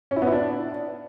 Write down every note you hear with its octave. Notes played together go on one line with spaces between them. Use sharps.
C#4
E4
B3
E4
D4